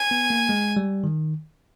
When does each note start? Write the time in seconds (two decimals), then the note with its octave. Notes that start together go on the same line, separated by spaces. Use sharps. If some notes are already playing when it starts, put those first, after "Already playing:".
Already playing: G#5
0.11 B3
0.30 A#3
0.49 G#3
0.77 G3
1.04 D#3